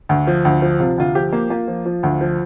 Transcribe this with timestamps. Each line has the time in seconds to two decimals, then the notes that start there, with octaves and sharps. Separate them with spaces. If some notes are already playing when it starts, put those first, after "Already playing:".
0.09 D2
0.27 F3
0.45 D2
0.62 F3
0.80 C3 F4
0.98 D2 F4
1.15 F3 G4
1.32 A#3
1.50 A#3 F4
1.68 F3
1.86 F3
2.03 D2
2.21 F3